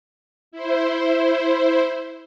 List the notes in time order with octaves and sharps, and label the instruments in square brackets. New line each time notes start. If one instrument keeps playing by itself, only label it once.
[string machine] E4 C5